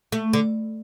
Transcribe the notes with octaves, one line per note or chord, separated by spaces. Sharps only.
A3
D3